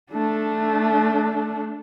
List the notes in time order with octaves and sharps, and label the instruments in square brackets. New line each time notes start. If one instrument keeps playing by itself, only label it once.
[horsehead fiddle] A3 D4